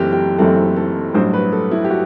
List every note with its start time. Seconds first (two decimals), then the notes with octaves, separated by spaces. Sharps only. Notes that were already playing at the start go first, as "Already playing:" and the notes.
Already playing: F#1 F#2 E3 A3 C4 G4
0.13 G4
0.38 F#1 F#2 E3 A3 C4 A4
0.76 A4
1.14 A1 G2 F#3 C5
1.33 B4
1.52 A4
1.71 E4
1.85 G4
1.90 F#4